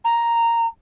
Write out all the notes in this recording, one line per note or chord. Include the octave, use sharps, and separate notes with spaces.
A#5